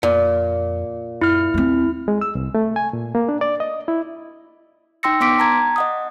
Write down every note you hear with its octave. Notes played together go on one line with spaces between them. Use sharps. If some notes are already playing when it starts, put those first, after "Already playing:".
F2 A#2
F#2 E4 F6
D#2 A3 C4
G#3
E6
C2
A3
G#5
A#2
A#3
D4
D5
D#5
E4
D#4 G5 C6 E6 A#6 C#7
B3 D4 C6 D6 B6 D7
A5 A#5 G#6
D#5 F#5 D#6